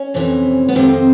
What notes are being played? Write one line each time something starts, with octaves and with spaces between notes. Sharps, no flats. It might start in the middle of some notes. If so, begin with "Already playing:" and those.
Already playing: C#4
F2 C3 E3
B3
F2 C3 D#3 C4